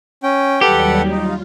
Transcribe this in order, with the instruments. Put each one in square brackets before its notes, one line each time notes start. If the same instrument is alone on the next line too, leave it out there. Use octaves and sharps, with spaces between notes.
[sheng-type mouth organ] C#4 G5
[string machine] D#2 F#3 G3 [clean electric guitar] G4 [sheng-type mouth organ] A4 B4 F#5
[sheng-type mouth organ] D#4 [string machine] F4